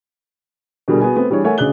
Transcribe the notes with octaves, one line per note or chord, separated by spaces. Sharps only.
B2 D3 G3 G#4 A#4 D5
B3 F#4 G#4 G#5
A3 B3 C4
E3 G3 D4 G#4 C#5
A3 A#4 C#5 E5 F#5 G#5
D2 C#3 G#4 D5 F#6 G7